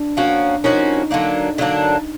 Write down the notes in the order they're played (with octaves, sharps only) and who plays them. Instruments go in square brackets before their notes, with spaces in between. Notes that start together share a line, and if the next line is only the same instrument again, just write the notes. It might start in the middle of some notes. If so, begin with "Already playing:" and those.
Already playing: [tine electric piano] D4
[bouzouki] F3 A#3 C#4 F#4
[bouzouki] F3 A#3 C#4 F#4 [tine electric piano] D#4
[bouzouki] D3 F#3 A#3 D4
D3 F#3 A#3 D4